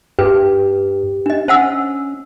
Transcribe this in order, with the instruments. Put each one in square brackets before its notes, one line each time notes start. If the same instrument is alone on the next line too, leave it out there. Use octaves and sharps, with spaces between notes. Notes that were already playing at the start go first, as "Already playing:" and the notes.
[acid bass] G2 [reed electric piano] G4 [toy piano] B4
[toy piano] D4 D#5
[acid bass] C#4 [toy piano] C5 F#5 E6